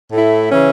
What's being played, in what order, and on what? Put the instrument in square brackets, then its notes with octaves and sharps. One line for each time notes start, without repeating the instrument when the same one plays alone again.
[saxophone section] A2 A3 E4
C#3 E3 C#4